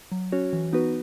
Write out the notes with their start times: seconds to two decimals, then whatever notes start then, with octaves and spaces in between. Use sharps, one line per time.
0.12 F#3
0.32 C#4 F#4 C#5
0.53 E3
0.73 B3 D#4 F#4 B4